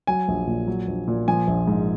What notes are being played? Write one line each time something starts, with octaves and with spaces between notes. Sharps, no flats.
F#3 G#5
A#1
A#2
F#3
A#1
A#2
F3 G#5
A#1
G#2